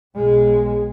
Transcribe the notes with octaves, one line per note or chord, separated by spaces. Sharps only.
B1 G#3